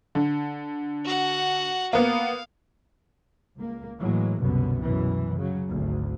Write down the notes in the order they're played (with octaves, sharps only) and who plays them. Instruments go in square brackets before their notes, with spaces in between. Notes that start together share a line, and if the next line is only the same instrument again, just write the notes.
[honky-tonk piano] D3
[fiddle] F#4 F#5
[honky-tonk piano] A#3 B3 [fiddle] F5
[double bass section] C#2 A#3
A2 E3 F#3 G#3 A#3
C2 F#2 B2 D3 B3
F#2 B2 E3
C#3 F#3
G#1 D2